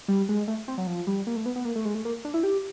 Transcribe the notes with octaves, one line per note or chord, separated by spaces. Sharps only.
G3
G#3
A3
C4
F#3
F3
G3
A#3
A3
B3
B3
A#3
A3
G#3
A3
A#3
D4
E4
G4